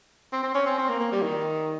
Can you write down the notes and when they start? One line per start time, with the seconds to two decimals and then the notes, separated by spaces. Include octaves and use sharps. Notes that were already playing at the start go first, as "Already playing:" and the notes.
0.33 C4
0.43 C4
0.55 C#4
0.66 C4
0.78 C4
0.89 A#3
0.99 A#3
1.12 G3
1.22 D#3